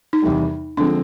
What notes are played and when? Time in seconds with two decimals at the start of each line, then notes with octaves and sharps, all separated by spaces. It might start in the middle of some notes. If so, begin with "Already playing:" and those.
0.13 D#4
0.22 E2 C3 D#3 G3
0.77 D3 F3 G#3 C4 D4